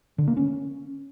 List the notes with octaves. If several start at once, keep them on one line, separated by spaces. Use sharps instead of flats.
D3
A#3
C#4